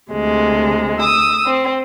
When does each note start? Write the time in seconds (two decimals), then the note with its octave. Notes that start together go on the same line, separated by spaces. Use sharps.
0.11 D2 C3 G#3
1.01 D#6 E6
1.46 C4